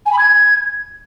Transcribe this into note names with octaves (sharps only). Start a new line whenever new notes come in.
G#5
B5
G#6